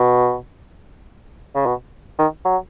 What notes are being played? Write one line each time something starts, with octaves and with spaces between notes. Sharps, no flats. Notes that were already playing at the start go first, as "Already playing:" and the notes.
Already playing: B2
C#3
B2
D#3
F#3